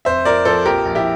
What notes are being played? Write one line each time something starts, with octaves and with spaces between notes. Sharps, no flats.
F1 C5 E5
F3 A#4 D5
F3 A4 C5
A#1 G4 A#4
A#1
E4 G4